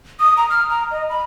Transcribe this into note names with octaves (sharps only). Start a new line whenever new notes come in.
D#6
A#5
F6
A#5
D#5
B5